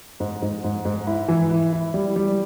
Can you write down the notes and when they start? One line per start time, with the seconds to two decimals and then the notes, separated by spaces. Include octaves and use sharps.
0.20 G#2
0.42 G#2
0.64 G#2
0.85 G#2
1.07 E4
1.28 E3
1.51 E4
1.73 E4
1.94 G3
2.16 G3